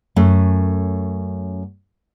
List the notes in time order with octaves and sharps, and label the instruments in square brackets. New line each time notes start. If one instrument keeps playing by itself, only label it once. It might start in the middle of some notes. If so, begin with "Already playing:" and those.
[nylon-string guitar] F#2 A3 C#4